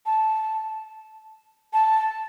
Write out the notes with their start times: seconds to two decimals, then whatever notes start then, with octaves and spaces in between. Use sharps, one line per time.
0.06 A5
1.73 A5